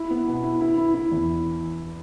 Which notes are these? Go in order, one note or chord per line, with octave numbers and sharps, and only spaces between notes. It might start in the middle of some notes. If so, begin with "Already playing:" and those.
Already playing: E4
B3
B2
E4
E4
E4
E4
E2